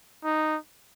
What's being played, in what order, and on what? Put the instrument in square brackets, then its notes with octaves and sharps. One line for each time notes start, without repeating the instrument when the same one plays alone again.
[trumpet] D#4